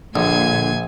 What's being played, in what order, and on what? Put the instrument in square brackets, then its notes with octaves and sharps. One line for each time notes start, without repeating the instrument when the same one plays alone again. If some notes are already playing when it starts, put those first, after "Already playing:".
[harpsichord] A#1 [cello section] A#2 [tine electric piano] D3 [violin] G#5 G#6